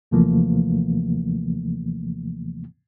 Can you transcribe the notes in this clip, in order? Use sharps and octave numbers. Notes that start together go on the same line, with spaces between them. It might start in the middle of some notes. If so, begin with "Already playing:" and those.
D#2 C3 E3 F3 A3 A#3